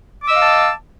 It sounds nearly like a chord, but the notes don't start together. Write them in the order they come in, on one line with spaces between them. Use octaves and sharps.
D6 E6 D#5 F5 A5